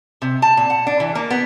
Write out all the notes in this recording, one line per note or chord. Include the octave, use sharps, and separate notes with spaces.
C3
A5
A#2
F#5
D4
E3
A#3
B3